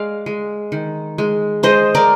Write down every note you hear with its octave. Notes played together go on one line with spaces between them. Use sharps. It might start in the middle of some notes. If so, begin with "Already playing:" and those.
Already playing: G#3 D5 F5
G#3
D#3
G#3
G#3 C5 D#5
A#4 D5